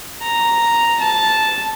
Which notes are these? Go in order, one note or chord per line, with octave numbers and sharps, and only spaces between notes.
A#5
A5